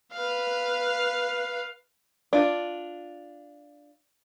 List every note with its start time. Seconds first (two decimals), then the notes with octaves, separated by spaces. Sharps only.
0.12 B4 F5
2.33 D4 F4